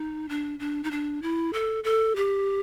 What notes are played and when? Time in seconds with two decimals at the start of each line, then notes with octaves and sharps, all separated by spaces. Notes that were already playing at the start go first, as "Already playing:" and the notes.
Already playing: D#4
0.29 D4
0.60 D4
0.84 D#4
0.91 D4
1.22 E4
1.53 A4
1.84 A4
2.16 G4